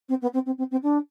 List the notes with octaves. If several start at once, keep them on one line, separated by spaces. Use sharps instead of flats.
C4
B3
C4
C4
C4
C4
D4